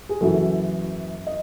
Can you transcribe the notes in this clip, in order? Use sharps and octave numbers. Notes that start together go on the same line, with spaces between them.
G#4
F#1 F#2 E3 F#4 A4
D#5